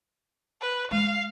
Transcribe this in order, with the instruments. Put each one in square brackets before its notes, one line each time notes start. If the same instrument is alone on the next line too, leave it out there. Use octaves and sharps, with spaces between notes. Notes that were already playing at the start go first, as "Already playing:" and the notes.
[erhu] B4
[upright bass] G#3 [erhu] F5